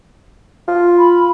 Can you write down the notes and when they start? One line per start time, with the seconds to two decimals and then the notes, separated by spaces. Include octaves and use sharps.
0.68 F4
0.99 B5